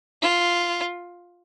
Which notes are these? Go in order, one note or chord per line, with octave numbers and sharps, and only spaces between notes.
F4